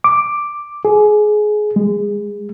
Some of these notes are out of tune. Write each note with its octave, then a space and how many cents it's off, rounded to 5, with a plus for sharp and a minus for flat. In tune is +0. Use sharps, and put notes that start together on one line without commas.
D6 +5
G#4 +20
G#3 -20